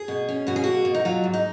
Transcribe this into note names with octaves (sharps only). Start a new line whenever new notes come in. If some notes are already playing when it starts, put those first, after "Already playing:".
Already playing: G#4
B2
C#4
B2 F#4
G#4
A#3 F#4
B2
D#4
F#3 F4
G#2
D#4